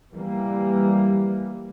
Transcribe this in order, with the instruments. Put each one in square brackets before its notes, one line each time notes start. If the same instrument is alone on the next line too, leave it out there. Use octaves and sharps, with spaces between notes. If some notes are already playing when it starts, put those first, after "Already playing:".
[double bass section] E3 G3 A#3